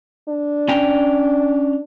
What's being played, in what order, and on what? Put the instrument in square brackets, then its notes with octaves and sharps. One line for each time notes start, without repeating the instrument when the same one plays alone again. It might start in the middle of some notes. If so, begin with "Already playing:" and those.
[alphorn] D4
[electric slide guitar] C#4 G5 A#5